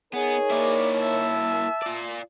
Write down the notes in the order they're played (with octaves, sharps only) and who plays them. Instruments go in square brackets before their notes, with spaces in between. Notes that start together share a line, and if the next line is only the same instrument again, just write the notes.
[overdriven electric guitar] B3 [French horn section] D#4 A#4 C#5 [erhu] G#4
[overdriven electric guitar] A#3 E4 [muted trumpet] D5
[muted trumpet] E5 [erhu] A5
[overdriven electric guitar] F4 D5